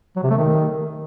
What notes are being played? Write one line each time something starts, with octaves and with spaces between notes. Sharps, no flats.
F#3
C3
A3
D#3